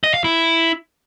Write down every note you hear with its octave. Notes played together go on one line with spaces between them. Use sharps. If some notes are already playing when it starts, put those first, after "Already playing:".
D#5
F5
E4